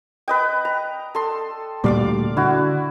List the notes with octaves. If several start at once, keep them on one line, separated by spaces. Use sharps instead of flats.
B4 D#5 G5
A#5
A4 C6
D2 A#2 G3 D5 F5 D6
D3 E4 F#4